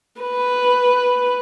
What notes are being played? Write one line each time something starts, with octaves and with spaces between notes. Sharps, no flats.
B4